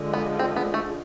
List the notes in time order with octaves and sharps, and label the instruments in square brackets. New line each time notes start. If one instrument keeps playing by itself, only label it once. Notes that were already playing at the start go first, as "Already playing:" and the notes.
Already playing: [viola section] D3 F3 G#3
[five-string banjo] B3
C4
B3
A3